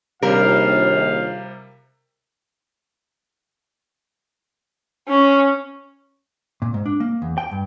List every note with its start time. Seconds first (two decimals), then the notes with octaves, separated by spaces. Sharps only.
0.23 A#1 D#2 C3 G3 A#4 F5
5.08 C#4
6.62 A#2
6.74 G#2
6.86 D4
7.00 A#3
7.22 E2
7.38 G5
7.51 G2